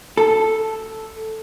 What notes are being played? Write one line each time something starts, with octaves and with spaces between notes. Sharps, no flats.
A4